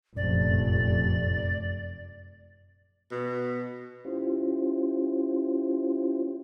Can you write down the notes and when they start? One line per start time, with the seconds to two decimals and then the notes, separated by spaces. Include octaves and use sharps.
0.16 F1 A#1 F#2 A3 D5
3.11 B2
4.05 C#4 E4 F4 G4 C5